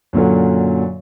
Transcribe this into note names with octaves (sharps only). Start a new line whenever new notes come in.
F#2 A#2 D3 F#3